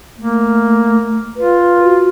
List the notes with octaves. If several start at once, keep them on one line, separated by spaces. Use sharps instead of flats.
A3 A#3
F4 B4
F#4